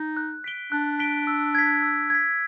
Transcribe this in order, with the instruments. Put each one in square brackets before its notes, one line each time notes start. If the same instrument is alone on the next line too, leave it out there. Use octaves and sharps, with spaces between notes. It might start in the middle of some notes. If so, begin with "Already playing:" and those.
Already playing: [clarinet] D#4
[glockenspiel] F#6
B6 D7 G7
[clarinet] D4 [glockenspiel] F#6
[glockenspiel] B6 D7 G7
E6
G#6 B6
E6
G#6 B6